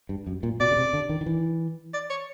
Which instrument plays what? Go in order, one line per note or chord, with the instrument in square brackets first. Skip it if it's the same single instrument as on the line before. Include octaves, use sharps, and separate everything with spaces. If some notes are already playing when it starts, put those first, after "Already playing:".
[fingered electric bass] G2
F#2
A#2
[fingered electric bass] B2 [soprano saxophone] D5
[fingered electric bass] C#3
C3
D3
D#3
D#3
E3
[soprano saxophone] D5
C#5